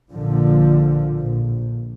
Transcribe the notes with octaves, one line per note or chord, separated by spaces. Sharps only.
A#1 A#2 D3 F3
A#1